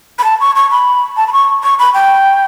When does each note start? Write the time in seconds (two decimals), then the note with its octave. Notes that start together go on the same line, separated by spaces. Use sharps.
0.19 B5
0.24 A5
0.41 C#6
0.56 C#6
0.71 B5
1.17 A5
1.27 B5
1.33 C#6
1.64 C#6
1.79 B5
1.94 G5